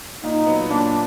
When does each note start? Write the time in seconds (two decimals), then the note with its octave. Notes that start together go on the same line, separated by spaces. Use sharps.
0.24 A#2 D#4
0.46 F#3 B3
0.70 A#2 D4